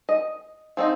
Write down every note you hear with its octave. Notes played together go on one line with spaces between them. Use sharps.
D#5
F3 C4 D#4